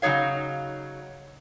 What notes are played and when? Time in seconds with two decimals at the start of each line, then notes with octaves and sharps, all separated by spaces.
0.02 C#3 F#3 D#4 C#5 F5